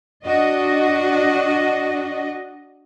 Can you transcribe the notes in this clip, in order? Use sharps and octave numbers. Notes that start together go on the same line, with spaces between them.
D4 F#4 D#5